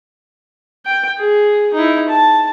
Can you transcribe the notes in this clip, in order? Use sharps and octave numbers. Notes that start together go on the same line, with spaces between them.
G5
G#4
D#4 E4
A5